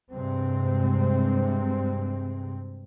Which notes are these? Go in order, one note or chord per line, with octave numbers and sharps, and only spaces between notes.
G2 C3 G#3 C4